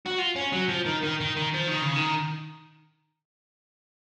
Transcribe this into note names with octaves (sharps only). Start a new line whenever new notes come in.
F#4
F4
C#4
F#3
F3
D#3
D#3
D#3
D#3
F3
D#3
C#3
D#3